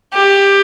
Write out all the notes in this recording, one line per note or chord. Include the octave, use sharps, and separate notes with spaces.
G4